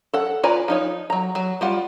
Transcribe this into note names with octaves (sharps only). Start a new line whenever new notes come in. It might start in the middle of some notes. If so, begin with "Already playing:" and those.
A4 F#5
F4 B4 D5 G#5 A#5
F3 D#4 C#5
F#3 A#5
F#3
G3 F4 F#5